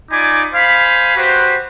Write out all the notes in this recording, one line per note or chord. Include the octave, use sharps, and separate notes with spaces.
D#4 F4 D5 G#5 B5 D6
C5 F5 G#5 B5
F#4 G4 B4 C5